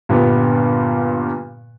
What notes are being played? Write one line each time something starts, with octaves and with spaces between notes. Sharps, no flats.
G2 A#2 D3 G3 B3